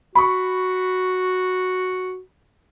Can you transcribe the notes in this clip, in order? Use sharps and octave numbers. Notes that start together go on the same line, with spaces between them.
F#4 B5 C#6